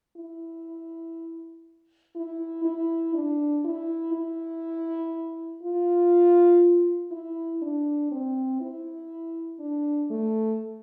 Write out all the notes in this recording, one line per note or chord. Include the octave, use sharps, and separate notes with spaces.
E4
E4
E4
D4
E4
E4
F4
E4
D4
C4
E4
D4
A3